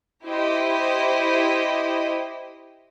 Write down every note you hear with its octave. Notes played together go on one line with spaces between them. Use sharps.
E4 G4 C5 D#5